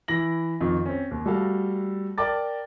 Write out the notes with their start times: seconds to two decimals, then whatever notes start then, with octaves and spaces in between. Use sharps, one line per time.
0.08 E3 E4 A#6 F#7
0.60 F2 D#3 F4
0.86 C4 C#4
1.11 D#2
1.26 G3 A3 F#4 A4 F5
2.18 A#4 D5 G5 A5 D6 A6